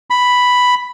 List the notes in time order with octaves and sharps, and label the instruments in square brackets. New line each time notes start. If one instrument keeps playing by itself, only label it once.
[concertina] B5